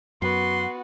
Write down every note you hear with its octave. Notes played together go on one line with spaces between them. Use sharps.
F#2 B3 F#4 C6